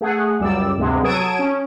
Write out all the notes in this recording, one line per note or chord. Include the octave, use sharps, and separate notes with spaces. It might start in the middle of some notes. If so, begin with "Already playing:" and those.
A3 G#4 F#5
C#2 F#2 G3 D5 E6
D2 G2 C3 G#3 B3
F#3 A4 D#6 G#6 D7 E7
C#4